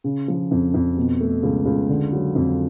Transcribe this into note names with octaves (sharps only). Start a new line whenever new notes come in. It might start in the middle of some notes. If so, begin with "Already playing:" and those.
C#3
F3
F2
F2
B2
A3
C#2
C#2
D3
F#3
F2